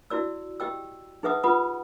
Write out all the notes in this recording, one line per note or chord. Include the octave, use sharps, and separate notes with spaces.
E4 F#4 D5 E6
G4 D#5 G5 E6
D#4 G#4 B4 E5 F#5 D#6
F4 G4 B4 F#5 B5 D#6